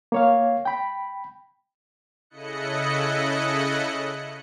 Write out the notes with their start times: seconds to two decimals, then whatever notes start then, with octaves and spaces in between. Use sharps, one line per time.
0.12 A#3 C#5 F5
0.65 G5 B5
2.30 C#3 E4 A4 D#5 F#6 C#7